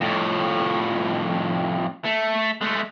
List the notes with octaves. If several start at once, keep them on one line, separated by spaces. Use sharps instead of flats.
F2 A2
A3
G#3 A3